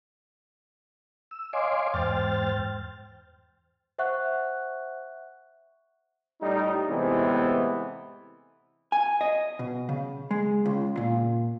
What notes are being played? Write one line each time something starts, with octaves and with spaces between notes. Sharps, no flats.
E6
C#5 D#5 F5 G#5 C6 D6
E2 G#2 C5 G5 F6 A6
C5 E5 F#5 C#6 F#6
A2 G3 D#4
A2 C3 E3 G#3 B3
G#5
D#5
B2
C#3
G#3
C#2
A#2